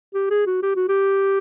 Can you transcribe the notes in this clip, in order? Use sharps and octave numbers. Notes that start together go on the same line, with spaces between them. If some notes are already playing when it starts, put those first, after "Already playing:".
G4
G#4
F#4
G4
F#4
G4